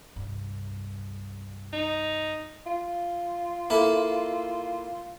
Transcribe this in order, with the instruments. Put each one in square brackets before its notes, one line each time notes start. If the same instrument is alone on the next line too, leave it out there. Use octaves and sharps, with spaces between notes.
[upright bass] C2 G2
[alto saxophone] D#4
[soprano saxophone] F4
[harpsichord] A#3 E4 A4